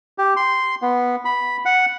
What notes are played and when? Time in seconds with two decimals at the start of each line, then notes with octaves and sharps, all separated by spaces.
0.18 G4
0.36 C6
0.82 B3
1.25 B5
1.65 F#5